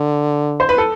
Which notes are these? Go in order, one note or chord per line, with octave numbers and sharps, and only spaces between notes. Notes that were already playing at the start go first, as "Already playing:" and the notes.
Already playing: D3
C5
B4
A4